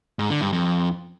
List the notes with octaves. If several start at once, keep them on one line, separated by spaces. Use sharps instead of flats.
G#2
D3
G2
F2